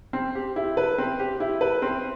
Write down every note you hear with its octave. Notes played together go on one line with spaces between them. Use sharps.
C4
G4
E4
B4
C4
G4
E4
B4
C4